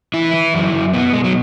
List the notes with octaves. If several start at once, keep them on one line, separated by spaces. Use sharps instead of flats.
E3 E4
E3
F#2
F#2
B2 B3
B2 G#3
F#3